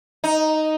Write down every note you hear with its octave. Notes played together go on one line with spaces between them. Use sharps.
D#4